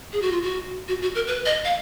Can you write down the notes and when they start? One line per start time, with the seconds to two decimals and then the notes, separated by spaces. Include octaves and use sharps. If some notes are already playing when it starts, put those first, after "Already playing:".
0.13 G#4
0.22 F#4
0.32 F4
0.42 F#4
0.88 F#4
1.02 F#4
1.15 A#4
1.27 B4
1.46 D#5
1.65 F5